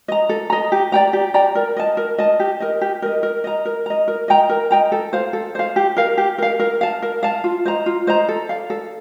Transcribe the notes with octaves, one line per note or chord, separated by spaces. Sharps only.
D#5 A#5
A4
D#5 A#5
G4
D5 G5 A#5
G4
D5 G5 A#5
A#4
D#5 A5
A#4
D#5 A5
G4
A#4 D#5
G4
A#4 D#5
A#4
D#5 A#5
A#4
D#5 A#5
A#4
D#5 G5 A#5
A#4
D#5 G5 A#5
A4
C5 F5
A4
C5 F5
G4
A#4 F5
G4
A#4 F5
A#4
F5 A5
A#4
F5 A5
F4
C5 D#5 A#5
F4
C5 D#5 A#5
A4
D5 F5
A4